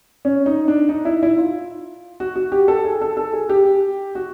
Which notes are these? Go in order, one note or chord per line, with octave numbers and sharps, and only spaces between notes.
C#4
D#4
D4
D#4
E4
E4
F4
F#4
F#4
G4
A4
G#4
A4
A4
G#4
G4
F#4